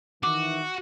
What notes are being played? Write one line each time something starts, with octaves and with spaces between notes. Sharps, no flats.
D#3 E3 F#4 E5 D6